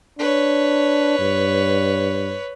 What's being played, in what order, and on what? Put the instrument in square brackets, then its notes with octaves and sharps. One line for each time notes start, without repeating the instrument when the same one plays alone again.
[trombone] D4 [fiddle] B4 C#5
[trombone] G2